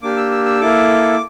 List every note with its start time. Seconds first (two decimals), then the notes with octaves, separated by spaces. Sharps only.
0.02 A#3 D4 G4 D6
0.16 E6
0.31 E6
0.45 E6
0.60 A#3 E4 A4 D6